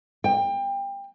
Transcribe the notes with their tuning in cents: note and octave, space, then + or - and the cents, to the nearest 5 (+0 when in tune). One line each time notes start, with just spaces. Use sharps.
G5 +25